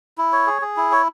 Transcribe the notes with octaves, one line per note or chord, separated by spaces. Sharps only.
E4
C#5
G#4
G#4
E4
C#5